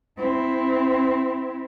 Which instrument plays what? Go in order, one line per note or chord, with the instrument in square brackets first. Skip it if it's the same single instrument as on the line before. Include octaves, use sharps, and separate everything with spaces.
[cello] C4 E4